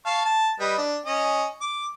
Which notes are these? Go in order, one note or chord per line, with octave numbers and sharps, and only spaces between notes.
F5 A5 C#6
A5
G3 B4 D#5
D4
C#4 D#5
D6